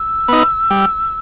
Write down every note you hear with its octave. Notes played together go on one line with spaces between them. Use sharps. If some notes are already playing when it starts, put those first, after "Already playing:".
Already playing: E6
B3 D#4
G3